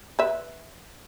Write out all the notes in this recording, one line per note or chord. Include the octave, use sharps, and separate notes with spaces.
B4 E5